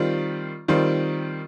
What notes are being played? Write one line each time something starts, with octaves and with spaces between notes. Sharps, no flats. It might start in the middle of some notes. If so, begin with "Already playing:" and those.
Already playing: D#3 G3 C4 F4
D#3 G3 C4 F4